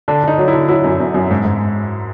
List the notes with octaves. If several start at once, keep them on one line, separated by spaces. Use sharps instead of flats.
D3 D4
D3 D#4
F#3
E4
D3
F#3 E4
F#2
F#2
F#2
G#2
G#2